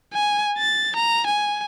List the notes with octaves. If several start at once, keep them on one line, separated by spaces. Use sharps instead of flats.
G#5
A6
A#5
G#5